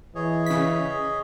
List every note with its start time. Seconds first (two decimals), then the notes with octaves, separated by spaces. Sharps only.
0.15 E3 G#4 C#5 D#5
0.46 C#3 B6